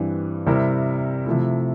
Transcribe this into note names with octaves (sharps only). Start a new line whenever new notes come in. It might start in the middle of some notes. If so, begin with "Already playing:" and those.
Already playing: G2 E3 G3 C4
C3 G3 C4 E4 A#4
C3 F3 A3 E4